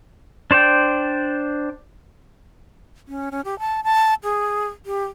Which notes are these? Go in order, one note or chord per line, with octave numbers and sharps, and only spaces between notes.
D4 C5 D5 G5
C#4
C#4
G4
A5
A5
G#4
G4